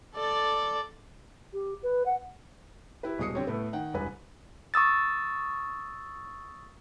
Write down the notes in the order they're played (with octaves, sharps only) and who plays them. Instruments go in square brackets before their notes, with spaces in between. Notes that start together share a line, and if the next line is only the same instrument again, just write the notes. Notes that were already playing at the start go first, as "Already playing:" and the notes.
[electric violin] A4 D5
[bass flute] G4
B4
F#5
[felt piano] E4 G4 B4
D#1 B2 G#3 D#6 C7 C#7
D3 C4 G4 C#5
A2 A3 B3
D#3 F#5 G5
E1 C2 B4 G#5
[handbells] C#6 D#6 E6 A6